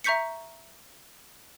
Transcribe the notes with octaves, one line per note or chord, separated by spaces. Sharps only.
E5 A#5 C#6 G6 B6 C#7